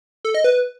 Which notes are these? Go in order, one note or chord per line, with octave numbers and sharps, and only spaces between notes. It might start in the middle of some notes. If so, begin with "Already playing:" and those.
A4
D#5
B4